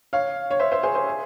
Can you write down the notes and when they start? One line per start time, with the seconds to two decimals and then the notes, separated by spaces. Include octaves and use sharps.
0.13 C#5 F5
0.51 C#5
0.59 C5 E5
0.71 C5 E5
0.83 G#4 C5
0.95 G#4 C5
1.07 G#4